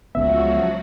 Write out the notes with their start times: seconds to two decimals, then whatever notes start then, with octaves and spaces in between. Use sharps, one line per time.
0.15 C#2 C#3 F3 F#3 B3 F#4 E5